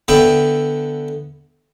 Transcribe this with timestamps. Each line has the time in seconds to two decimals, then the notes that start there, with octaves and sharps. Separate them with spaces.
0.08 D3 B3 E5 G5